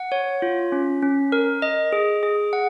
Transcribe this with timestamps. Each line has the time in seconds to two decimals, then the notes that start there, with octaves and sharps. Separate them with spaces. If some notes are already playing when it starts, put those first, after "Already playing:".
Already playing: F#5
0.12 C#5
0.42 F4
0.72 C#4
1.02 C#4
1.32 A#4
1.62 D#5
1.92 G#4
2.23 G#4
2.53 F#5